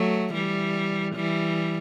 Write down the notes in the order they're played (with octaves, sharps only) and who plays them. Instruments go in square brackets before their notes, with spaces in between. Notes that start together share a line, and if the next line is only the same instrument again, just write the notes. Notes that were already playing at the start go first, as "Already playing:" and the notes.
Already playing: [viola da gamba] F#3 A3
E3 G3
E3 G3